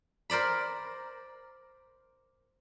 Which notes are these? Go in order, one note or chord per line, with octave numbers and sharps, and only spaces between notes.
A#4 C5 D5 B5